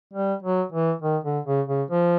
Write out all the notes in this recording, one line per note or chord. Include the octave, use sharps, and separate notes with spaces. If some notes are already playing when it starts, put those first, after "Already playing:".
G3
F#3
E3
D#3
D3
C#3
C#3
F3